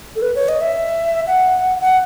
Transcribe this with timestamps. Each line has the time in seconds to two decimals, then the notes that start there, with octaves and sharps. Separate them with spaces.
0.16 A4
0.22 B4
0.35 C#5
0.49 D#5
0.61 E5
1.27 F#5
1.81 F#5